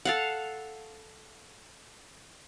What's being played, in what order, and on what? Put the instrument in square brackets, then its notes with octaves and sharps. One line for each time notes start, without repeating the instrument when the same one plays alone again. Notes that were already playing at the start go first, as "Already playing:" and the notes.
[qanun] A4 F5 F#5